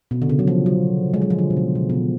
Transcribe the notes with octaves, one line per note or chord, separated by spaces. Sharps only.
B2
D3
C#3
F#3
F3
F#3
G#3
F#3
F3
D3
B2
C#3
B2
B2
C#3